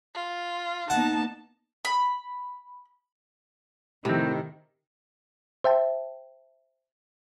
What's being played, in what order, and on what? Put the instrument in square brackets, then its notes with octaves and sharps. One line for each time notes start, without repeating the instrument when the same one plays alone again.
[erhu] F4
[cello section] A#3 B3 D#4 [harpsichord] F#5 [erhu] A5
[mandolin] B5
[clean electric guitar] A2 C4 [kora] C3 [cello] D#3
[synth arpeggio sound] C5 E5 G5 A5